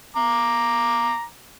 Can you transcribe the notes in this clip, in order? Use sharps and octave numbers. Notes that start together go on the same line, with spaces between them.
A#5 D6